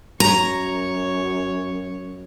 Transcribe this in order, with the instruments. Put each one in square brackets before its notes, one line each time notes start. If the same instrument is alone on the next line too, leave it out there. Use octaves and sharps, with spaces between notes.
[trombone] F#2 [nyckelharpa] C#5 [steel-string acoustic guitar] A#5